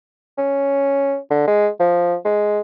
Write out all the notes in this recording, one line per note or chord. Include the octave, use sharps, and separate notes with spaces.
C#4
D3
G#3
F3
G#3